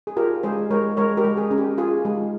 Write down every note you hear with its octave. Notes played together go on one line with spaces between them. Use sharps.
G#4
F4 G4 A#4
G#3 G#4 C5
G#3 A#4 C#5
G#3 A#4 C#5
G4 A#4
G#3
G#4
C#4
G4
F4 G#4
G#3